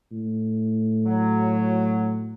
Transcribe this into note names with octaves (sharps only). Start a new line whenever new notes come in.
A2
F#3